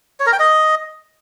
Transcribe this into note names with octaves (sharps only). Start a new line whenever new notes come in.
C#5
A#4
G5
D#5